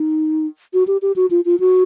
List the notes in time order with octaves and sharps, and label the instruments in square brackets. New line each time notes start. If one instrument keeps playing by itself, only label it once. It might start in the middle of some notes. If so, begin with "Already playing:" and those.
Already playing: [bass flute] D#4
F#4
G4
G4
F#4
F4
F4
F#4